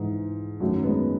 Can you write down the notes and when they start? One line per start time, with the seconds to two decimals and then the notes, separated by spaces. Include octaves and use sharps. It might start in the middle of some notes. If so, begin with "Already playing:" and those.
Already playing: G#2 E3
0.60 F#2 D#3 F#3 A3
0.83 G#3 B3